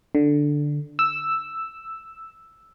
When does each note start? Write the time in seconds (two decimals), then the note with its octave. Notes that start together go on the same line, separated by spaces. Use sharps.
0.15 D3
0.99 E6